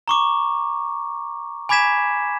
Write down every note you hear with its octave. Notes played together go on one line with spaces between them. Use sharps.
A#5 C#6 D6
G#5 B5 D6 G#6 B6 E7